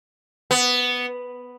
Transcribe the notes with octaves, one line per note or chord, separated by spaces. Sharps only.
B3